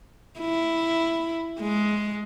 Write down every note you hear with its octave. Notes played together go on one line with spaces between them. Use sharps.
E4
G#3